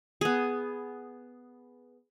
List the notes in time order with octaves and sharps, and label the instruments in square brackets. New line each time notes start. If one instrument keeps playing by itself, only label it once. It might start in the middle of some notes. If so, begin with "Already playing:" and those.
[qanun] B3 G#4